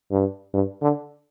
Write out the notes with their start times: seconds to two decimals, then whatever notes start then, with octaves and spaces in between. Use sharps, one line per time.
0.11 G2
0.54 G2
0.82 D3